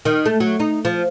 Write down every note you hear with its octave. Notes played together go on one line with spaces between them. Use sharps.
D#3
A3
F#3
D#4
F3